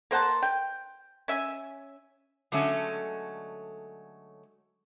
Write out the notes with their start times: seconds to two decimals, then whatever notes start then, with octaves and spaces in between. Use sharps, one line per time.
0.11 A#3 C5 F#5 A5
0.42 G5
1.28 C#4 E5 G#5
2.52 D3 F#3 G#3 A3 C#4